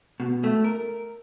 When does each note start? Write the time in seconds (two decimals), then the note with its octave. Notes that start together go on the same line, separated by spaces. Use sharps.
0.20 B2
0.44 A3
0.64 A#4